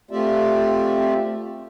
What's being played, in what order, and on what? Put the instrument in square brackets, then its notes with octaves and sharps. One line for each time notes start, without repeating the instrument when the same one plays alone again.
[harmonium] A3 C4 F4 G4 D5 E5